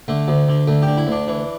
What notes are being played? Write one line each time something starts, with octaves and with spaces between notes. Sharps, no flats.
D3 A3
D2
D3
D2 A3
D3 G4
E4
D2
D4
E3